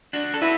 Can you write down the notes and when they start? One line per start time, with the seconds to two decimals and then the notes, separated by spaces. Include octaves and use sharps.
0.13 D4 F#4
0.34 A4
0.42 E4 F#4 B4